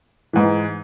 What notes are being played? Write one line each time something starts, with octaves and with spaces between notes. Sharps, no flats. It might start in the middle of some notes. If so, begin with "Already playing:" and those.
G#2 E3